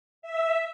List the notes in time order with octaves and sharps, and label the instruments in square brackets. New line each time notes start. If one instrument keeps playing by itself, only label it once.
[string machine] E5